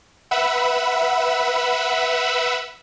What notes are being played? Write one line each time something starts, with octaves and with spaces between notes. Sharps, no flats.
B4 E5 F#5 B5 E6